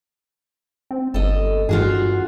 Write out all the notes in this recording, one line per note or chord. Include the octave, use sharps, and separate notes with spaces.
C4
G1 A4 D#5
G2 F4 F#4 G#4